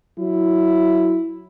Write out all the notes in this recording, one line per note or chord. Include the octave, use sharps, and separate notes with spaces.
F#3 E4